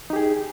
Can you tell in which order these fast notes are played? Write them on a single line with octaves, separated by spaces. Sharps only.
D#4 G4 G#4